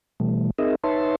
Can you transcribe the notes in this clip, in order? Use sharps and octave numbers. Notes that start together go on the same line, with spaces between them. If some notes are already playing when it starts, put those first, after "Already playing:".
B2 E3 G3 A3
C4 D#4 G#4 A#4 D#5 E5
D#4 B4 C#5 E5 A5 C6